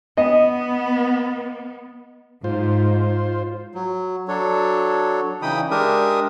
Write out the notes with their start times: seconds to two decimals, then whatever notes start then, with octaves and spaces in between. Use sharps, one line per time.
0.17 B3 D#5
2.44 G#2 F4 C5
3.75 F#3
4.28 F#3 D4 A4 C#5
5.42 C#3 E3 D#4 G5 B5 D#6
5.71 G#3 D4 G4 A#4 E5 D#6